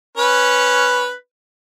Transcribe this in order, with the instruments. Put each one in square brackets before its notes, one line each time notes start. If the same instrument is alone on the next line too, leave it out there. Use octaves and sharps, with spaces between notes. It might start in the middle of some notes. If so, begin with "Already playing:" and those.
[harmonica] C#4 B4